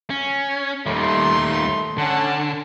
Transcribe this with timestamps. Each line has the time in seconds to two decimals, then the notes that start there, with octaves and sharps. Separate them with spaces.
0.10 C#4
0.86 D#2 G3 A3 D#4 C6
1.98 D3 C#4 F#5 A5